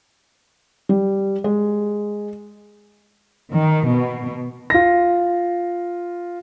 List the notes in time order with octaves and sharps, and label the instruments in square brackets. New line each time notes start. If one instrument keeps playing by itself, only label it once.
[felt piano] G3
G#3
[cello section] D#3
B2
[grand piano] F4 A#6